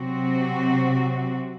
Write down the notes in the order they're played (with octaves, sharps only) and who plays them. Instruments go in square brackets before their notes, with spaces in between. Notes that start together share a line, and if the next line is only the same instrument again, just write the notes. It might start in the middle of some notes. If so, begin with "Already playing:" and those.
Already playing: [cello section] C3 F#3 C4 F#4